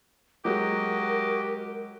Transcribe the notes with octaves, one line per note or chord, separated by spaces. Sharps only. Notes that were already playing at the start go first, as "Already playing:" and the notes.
F#3 G#3 F#4 G4 A#4 D#5